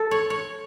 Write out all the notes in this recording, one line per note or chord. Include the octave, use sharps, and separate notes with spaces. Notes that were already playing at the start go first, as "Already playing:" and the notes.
Already playing: A4
C#5
C#5